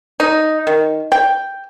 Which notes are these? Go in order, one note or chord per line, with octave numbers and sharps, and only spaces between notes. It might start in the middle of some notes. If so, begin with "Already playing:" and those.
D#4
D#3
G5